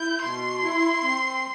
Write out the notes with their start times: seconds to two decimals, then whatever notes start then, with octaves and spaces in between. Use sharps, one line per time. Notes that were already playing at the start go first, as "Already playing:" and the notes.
Already playing: E4 G6
0.22 B2 C6
0.63 E4
1.03 C4